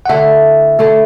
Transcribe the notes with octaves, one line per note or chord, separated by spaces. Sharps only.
F#5
D3 A3 E4 A4 E5
D3 A3 E4 A4